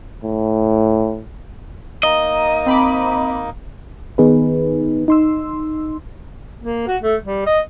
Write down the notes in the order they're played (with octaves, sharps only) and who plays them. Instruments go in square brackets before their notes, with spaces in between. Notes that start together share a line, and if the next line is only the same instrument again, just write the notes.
[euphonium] A2
[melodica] A#3 D#4 [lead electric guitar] D#5
[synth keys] C4 B5 D6
[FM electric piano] D#3 B3 D#4 G#4 B4
D#4 C6 E6
[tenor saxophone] A#3
F#4
A3
G3
D#5